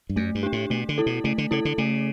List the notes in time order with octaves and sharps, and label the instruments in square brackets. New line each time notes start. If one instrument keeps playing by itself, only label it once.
[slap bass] G2
[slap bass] F#2 [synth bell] A3
[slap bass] G2
[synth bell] D4 G4
[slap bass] A2
[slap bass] B2 [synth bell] A3
[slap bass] D3
[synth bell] E4 A4
[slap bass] B2
[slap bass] C#3 [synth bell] A3
[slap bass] D3
[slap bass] C#3 [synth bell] E4 A4
[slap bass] D3
[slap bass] C#3 [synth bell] A3